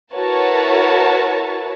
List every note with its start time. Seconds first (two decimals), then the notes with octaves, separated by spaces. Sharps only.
0.13 E4 F#4 A#4 B4 C#5 A5